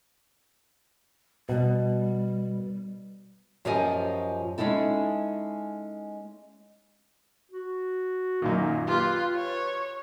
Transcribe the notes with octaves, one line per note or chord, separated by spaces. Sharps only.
B2 G3
F#2 F3 G4 C5 D#5 G#5
G#3 C#4 D#4 E4 A4
F#4
F#2 A#2 D#3 A#3
F4 G4 B4
C#5